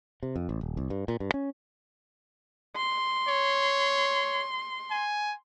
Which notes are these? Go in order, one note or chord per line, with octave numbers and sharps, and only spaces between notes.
C3
F2
A1
D#1
C2
G2
A#2
G2
C#4
C6
C#5
G#5